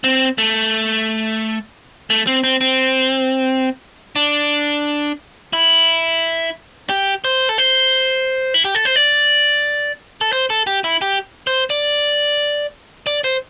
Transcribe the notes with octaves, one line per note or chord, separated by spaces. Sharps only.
C4
A3
A3
C4
C4
C4
D4
E4
G4
C5
A4
C5
E4
G4
A4
C5
D5
A4
C5
A4
G4
E4
G4
C5
D5
D5
C5